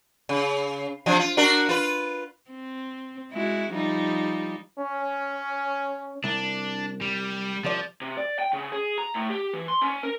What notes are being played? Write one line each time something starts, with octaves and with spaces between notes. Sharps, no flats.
C#3
C3 F3 D4
F4
D4 F#4 A#4
F4 B4
C4
G#3 E4 F#4
F3 G3 D#4
C#4
C2 D4
G3
C2 F3 D5
C3
D5
G5
C#3
G#4
A#5
A2
G4
E3
C6
C#4
A#4